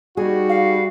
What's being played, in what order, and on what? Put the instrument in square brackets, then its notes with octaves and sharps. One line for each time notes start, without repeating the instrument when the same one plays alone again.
[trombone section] G3 F#4 [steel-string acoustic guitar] D#4 G#4
[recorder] F5